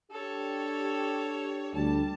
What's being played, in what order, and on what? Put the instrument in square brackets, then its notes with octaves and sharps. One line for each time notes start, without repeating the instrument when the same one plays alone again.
[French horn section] D4 G4 [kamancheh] A4 C#5
[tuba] D2 [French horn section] G3 [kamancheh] A5